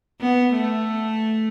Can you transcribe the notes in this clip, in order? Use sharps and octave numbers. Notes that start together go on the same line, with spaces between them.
B3
A3